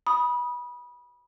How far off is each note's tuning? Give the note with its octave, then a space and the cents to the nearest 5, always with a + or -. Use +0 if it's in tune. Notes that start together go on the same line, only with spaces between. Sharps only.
B5 -25 D#6 +0